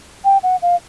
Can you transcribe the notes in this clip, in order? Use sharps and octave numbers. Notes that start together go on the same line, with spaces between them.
G5
F#5
F5